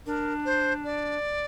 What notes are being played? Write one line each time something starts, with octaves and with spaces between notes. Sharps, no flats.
D4 A#4
C5
D5